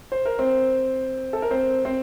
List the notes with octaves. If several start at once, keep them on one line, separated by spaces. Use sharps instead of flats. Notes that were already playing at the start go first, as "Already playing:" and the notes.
C5
A#4
C4 C5
A4
A#4
C4 C5
C4 C5